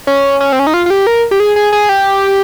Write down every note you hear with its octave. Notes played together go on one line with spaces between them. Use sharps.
C#4
C#4
C4
C#4
D#4
F4
F4
G4
A#4
G4
G#4
G#4
G#4
G4